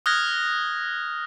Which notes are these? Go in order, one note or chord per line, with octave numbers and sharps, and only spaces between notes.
D#6 F6 F#6 G#6 A#6